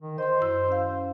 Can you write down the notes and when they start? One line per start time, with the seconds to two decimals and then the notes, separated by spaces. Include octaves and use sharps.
0.01 D#3
0.18 C5 D#5 C6
0.41 F#2 E4 E6
0.68 C#4 F5